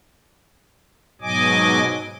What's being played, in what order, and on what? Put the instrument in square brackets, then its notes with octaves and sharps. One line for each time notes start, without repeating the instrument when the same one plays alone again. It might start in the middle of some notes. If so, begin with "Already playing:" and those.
[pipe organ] G#2 B2 F#3 D#5 G#5 D6